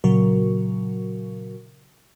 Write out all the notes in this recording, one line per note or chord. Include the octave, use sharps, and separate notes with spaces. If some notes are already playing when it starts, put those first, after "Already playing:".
A#2 C#3 F#3 F#4 A#4